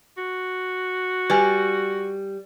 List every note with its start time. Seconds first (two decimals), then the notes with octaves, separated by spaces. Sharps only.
0.18 F#4
1.30 G3 B4 G#5